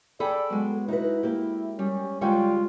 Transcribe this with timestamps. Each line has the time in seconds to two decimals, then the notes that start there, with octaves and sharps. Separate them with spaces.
0.20 G#4 A4 D5 G5 B5
0.50 F#3 G#3 B3
0.88 D#4 E4 F#4 B4
1.23 A#3 G4
1.79 G3 C#4
2.21 D2 G3 G#3 F4 C#5 G5